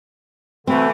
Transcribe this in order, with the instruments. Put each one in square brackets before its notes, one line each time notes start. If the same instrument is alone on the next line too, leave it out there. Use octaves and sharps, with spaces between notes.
[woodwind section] B2 D3 E3 [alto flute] A3 [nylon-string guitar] C4